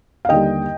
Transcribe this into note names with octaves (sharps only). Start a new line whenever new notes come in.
F5
D#2 D3 G3 D#5 G5